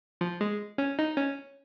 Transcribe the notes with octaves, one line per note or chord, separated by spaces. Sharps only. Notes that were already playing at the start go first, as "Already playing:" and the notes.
F3
G#3
C#4
D#4
C#4